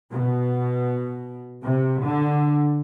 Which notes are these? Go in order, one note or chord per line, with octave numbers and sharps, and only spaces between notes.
B2
C3
D3